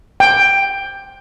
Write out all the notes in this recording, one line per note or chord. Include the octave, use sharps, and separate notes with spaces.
G5